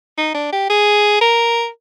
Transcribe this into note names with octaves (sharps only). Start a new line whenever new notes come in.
D#4
D4
G4
G#4
A#4